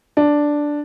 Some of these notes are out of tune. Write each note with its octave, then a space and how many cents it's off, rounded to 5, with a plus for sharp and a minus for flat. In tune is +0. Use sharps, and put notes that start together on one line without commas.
D4 +0